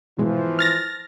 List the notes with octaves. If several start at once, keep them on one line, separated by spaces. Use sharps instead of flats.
G#2 B2 E3 F3 G#3
F6 A6 A#6